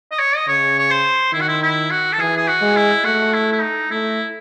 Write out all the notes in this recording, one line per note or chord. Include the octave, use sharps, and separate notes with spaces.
D#5
C#5
D#5
C#3 C#5
C#5
C5
D#3 E4
F#4
E4
E4
F#4
A4
E3 G#4
G#4
F#4
G#3
E4
A3 F#4
E4
E4
D#4
A3 E4